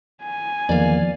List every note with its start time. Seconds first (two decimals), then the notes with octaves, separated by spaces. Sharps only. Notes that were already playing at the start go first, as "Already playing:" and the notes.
0.23 G#5
0.69 E2 D#3 F3 A#3 D5 F5